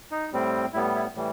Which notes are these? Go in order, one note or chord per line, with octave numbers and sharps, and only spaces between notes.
D#4
A2 G3 C4
A2 G3 B3 E4
E4
A2 E3 G3